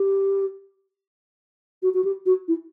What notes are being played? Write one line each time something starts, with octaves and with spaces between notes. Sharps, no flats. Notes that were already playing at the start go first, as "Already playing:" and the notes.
Already playing: G4
F#4
F#4
G4
F#4
E4